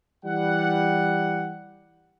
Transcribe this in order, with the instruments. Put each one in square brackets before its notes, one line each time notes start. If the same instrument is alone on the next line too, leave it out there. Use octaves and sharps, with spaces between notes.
[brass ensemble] E3 G3 F#5